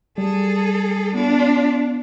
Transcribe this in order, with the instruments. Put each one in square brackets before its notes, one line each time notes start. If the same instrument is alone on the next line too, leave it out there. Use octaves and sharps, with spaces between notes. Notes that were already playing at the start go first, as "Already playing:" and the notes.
[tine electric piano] G3 [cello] G#4 A4
[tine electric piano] B3 [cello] D4 F4